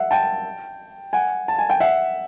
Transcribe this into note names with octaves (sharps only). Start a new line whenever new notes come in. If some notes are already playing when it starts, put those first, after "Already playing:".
Already playing: E5 F#5
G5 A5
F#5 G#5
A5
G#5
G5
E5 F#5